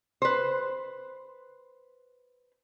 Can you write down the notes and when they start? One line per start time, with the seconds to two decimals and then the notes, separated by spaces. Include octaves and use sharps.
0.22 B4 C5